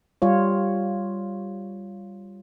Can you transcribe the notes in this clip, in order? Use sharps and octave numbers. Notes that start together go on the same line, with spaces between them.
G3 F4 C#5